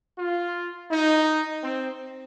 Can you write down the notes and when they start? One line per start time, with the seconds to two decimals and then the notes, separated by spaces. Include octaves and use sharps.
0.19 F4
0.92 D#4
1.64 C4